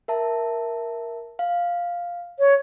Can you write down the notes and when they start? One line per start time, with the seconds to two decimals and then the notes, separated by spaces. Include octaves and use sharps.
0.08 A#4 E5 A5
1.39 F5
2.39 C#5